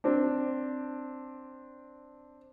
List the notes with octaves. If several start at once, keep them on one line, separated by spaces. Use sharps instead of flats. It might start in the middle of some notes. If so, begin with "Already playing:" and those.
C4 D4